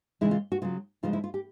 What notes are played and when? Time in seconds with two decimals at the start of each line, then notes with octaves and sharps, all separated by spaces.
0.21 C#3 E3 G#3 E4
0.31 F4
0.52 F#4
0.62 C#3 F#3 F4
1.03 C#3 F3 G#3 F4
1.13 E4
1.24 F4
1.34 G4